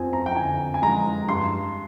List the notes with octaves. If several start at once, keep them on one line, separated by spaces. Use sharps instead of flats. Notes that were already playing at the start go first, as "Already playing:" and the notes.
Already playing: F2 C4 G#5
A#5
G5
D3 G#5
G#5
G#3 A#5
G2 C6